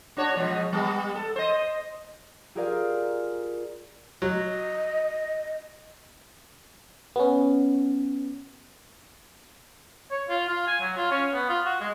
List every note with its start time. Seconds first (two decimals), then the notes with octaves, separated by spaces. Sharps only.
0.17 D4 F#4 C#5
0.36 B2 F3 G#3
0.73 G3 B3
1.15 A4
1.36 C5 D#5
2.55 F4 G4 G#4 A#4 D5 F5
4.22 F#3 D#5
7.16 B3 C#4
10.11 C#5
10.28 F4
10.48 F4
10.67 G#5
10.81 F#3
10.96 F4
11.11 C#4
11.34 B3
11.49 F4
11.65 F#4
11.81 G#3